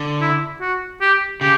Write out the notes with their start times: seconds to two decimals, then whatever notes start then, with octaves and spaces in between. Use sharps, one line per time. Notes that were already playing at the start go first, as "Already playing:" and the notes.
Already playing: D3
0.22 E4
0.61 F#4
1.02 G4
1.41 C#3 G4